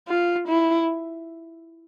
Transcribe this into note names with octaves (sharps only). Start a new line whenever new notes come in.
F4
E4